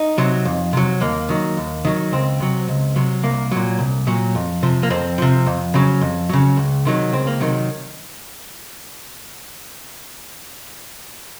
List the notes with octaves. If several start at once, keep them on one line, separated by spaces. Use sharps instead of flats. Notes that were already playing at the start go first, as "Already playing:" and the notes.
Already playing: D#4
C3 F#3
F2
C3 F#3
D#2 A#3
D#3 F#3
D#2
D#3 F#3
C#2 C4
C3 F#3
C#2
C3 F#3
C2 A#3
A#2 F#3
C2
A#2 F#3
F2
C3 F3
A#3
F2 C4
C3 F3
F2
C#3 F#3
F2
C#3 F#3
C#2
C3 D#3 F#3
C#2 C4
A#3
C3 D#3 F#3